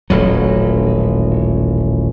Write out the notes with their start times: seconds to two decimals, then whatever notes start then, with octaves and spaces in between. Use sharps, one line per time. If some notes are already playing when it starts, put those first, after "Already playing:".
0.10 D#1 A1 F#3